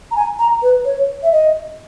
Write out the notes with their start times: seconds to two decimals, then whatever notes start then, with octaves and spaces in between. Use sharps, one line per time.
0.11 A#5
0.16 G#5
0.39 A#5
0.62 B4
0.85 C#5
1.23 E5
1.32 D#5